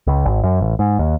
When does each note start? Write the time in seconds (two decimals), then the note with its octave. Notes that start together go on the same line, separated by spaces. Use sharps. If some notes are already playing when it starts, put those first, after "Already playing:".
0.07 C#2
0.25 G#1
0.43 F#2
0.61 A1
0.79 G#2
0.99 D#2